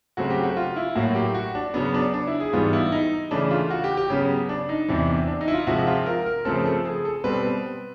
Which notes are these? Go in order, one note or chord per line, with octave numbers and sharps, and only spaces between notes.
C#3 F#3 A3 C4 F#4
G4
F#4
F4
E4
A2 F#3 A#3 F#4
G4
F#4
D4
C#3 F#3 B3 C#4
D4
D4
E4
G#4
G#2 E3 G3 B3 F4
E4
D#4
C#3 E3 A3 D4
F4
F#4
G4
G4
C#3 F#3 B3 C#4
D4
D#4
E2 C3 E3 D4
D4
D#4
E4
F4
C3 F3 G#3 F#4
F4
A#4
A#4
C#3 F3 A3 C4 A4
A4
G#4
A4
B2 G3 C4 B4